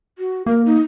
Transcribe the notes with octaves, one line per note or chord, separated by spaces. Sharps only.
F#4
A#3 A#4
D#4